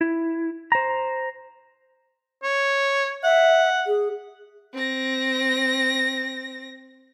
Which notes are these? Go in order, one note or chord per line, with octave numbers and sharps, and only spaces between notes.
E4
C5 A#5
C#5
E5 F#5
G#4
C4 A#6